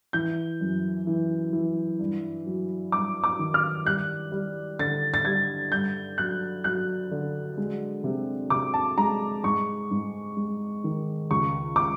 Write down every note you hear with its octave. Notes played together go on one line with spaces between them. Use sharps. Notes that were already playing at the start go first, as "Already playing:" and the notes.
E3 G6
F#2
E3
E3
G2
F#3
G2 D6
D6
D#3
F6
G3 F#6
G3
D3 A6
A6
G3 G#6
G2 G6
F#3 F#6
F#3 F#6
D3
G#3
C3
C3 D6
A5
G#3 A#5
G#2 C#6
G#2
G#3
D#3
C#2 C#6
D6